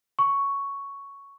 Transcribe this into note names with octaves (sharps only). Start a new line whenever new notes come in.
C#6